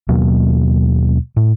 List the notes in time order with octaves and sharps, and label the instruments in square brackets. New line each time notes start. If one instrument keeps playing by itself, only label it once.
[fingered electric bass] D#2 B2 F#3 A#3
A2